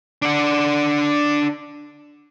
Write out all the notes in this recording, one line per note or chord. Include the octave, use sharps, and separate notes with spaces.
D4 F#5